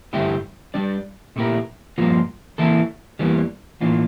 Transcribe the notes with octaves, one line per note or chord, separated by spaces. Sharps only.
G2 D3 A3 E4 G4
G3 D4 G4 D5
A#2 A3 E4 G4 A#4
G2 F3 A#3 F4
E3 A#3 E4 A4
E2 E3 G3 A#3
A2 E3 A#3 D4 F4